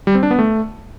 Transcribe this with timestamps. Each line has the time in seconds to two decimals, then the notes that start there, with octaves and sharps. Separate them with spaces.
0.07 G3
0.15 C4
0.23 D4
0.31 B3
0.39 A3